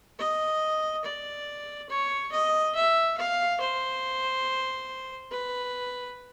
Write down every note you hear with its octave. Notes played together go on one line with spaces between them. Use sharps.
D#5
D5
C#5
D#5
E5
F5
C5
B4